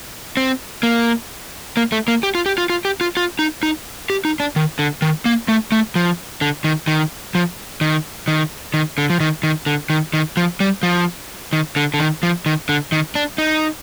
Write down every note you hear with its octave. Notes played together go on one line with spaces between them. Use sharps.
C4
A#3
A#3
A3
A#3
G4
F4
G4
F4
F4
G4
F4
F4
D#4
D#4
G4
D#4
D4
D#3
D3
D#3
A#3
A3
A3
F3
D3
D#3
D#3
F3
D#3
D#3
D#3
D3
F3
D#3
D#3
D3
D#3
D#3
F3
G3
F3
D#3
D3
D3
D#3
F3
D#3
D3
D#3
D4
D#4